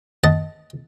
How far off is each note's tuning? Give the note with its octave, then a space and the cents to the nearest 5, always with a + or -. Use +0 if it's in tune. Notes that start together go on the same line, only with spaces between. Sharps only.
D#5 +10 F#5 +0 A5 +0